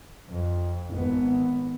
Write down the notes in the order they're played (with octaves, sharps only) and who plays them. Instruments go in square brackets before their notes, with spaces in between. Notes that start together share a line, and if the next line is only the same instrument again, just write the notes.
[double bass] F2
G#1 B3